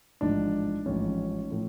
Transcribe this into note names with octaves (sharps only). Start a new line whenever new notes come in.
A1 G#2 F3 D4
A1 G#2 F3 C#4
A2 F3